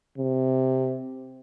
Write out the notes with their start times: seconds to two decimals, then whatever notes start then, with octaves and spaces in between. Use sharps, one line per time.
0.18 C3